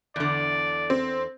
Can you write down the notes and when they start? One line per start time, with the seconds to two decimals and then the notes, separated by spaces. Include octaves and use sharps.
0.16 E2 D3 D5
0.90 C4